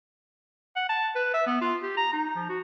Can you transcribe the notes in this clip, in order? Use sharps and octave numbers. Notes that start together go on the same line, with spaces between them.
F#5
A5
B4
E5
B3
F4
G4
A#5
D#4
F3
F#4